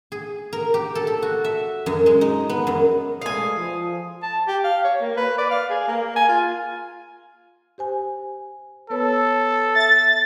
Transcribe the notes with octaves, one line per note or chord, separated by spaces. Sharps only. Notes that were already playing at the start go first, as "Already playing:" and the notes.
G#4
A#4
G4
A4
A4
F#4
E5
F#2
G#3
D#4
B3
F#2
G#3 A3 B4 F5 G#5 D#6
F3
A5
G4
F5
C#5
A#3
B4
D5
F5
G#4
A#3
G#5
F4
G4 C5 G#5
B3 A4 B4 C#5
E5 A5 A6